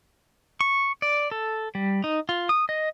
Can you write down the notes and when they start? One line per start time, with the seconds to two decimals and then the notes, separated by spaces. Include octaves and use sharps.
0.61 C#6
1.02 D5
1.31 A4
1.75 G3
2.04 D#4
2.29 F4
2.49 D#6
2.69 D#5